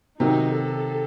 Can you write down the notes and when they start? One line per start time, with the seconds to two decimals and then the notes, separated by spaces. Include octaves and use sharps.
0.20 C3 D#3 F#3 D#4
0.58 A4